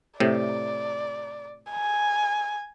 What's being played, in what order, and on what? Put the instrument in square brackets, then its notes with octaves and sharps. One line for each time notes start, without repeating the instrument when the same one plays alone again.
[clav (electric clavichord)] A2 C3 [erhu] D5
[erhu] G#5